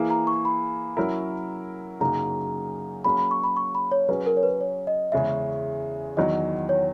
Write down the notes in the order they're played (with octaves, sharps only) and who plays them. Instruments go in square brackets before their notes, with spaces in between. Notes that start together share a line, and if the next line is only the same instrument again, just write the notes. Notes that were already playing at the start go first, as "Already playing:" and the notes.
Already playing: [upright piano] E3 A#3 E4 G#4
[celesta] A#5
C#6
B5
[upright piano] F#3 C#4 E4 A#4
[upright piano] F#2 C#3 F#3 A#3 D#4 [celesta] A#5
[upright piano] F#3 A#3 C#4 G#4 [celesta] B5
[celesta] B5
C#6
B5
C#6
B5
C#5
[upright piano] F#3 C#4 G#4 [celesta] B4
[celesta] A#4
C#5
B4
C#5
D#5
[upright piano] E2 C#3 G#3 C#4 [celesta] E5
[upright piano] E2 D#3 F#3 [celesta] D#5
[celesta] C#5